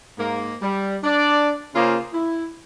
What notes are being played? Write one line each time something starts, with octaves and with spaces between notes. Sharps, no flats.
G#2 A#3
G3
D4 D5
C#3 A#3 C#4 F4 G#4 C5
E4